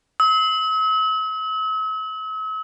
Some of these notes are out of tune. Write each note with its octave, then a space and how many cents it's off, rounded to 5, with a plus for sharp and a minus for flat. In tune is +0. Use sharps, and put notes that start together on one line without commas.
E6 -45